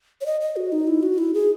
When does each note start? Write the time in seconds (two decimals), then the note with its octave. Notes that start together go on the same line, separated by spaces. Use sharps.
0.21 C#5
0.26 D#5
0.41 D#5
0.56 F#4
0.72 D#4
0.87 E4
1.03 F#4
1.18 E4
1.34 G#4